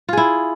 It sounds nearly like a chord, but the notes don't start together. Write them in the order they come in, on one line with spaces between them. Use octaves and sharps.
F4 G#4 E4